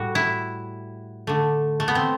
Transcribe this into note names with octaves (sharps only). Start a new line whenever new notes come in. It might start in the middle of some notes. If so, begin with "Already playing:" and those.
Already playing: A2 G3 F#4
E4
D3 A3
A3
B3
C4